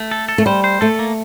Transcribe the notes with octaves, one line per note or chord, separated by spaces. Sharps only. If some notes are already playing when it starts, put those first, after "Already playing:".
Already playing: A3
A4
A4
A3
G3 C5
C5
A3 A4
A#3